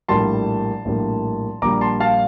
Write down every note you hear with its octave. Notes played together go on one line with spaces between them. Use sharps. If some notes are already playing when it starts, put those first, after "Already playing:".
A#1 A2 G3 A#3 A5 C6
A#1 A2 G3 A#3
A#1 A#2 G3 A#5 D6
A5 C6
F5 A5